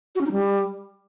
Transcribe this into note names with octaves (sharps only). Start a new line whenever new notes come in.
F#4
C#4
D#4
G3